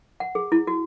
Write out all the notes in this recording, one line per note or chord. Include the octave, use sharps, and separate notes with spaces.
F#5
G#4
E4
F#4